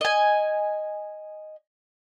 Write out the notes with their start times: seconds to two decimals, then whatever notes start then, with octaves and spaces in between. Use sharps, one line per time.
0.01 D#5 G#5